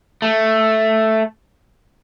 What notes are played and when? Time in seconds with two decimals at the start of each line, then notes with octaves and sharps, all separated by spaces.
0.22 A3